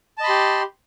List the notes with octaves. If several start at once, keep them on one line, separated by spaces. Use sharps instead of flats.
G4 D#5 A5 B5 C6